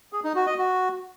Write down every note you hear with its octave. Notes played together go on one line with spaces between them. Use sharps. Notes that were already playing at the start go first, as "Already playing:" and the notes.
G#4
D#4
F#4
D#5
F#4